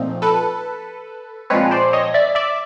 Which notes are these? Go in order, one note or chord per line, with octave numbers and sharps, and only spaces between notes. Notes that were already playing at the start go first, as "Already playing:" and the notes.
Already playing: A#2 F3 A3 C4 D#4
A4 B4
A#2 F3 G#3 C4 B4 C#5
C5 D5
C#5 D#5
D5 E5
D5 E5